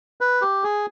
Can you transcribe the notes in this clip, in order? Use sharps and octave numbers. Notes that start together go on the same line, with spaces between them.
B4
G4
G#4